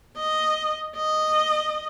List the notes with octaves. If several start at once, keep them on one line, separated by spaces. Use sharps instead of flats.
D#5
D#5